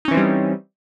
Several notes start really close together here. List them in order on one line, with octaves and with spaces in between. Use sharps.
D#4 C#4 E3 C4 G3